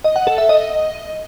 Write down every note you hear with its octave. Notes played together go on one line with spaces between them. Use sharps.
D#5
F#5
A4
E5
D#5